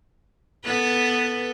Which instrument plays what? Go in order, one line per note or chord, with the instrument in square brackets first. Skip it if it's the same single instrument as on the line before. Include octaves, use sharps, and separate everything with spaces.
[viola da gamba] B3 A4 B4